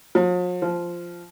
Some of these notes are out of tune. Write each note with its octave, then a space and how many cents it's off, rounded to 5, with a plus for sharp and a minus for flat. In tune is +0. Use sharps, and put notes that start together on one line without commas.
F3 +45
F3 -5